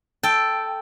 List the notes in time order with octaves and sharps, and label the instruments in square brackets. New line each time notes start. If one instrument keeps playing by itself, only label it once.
[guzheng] A4 G5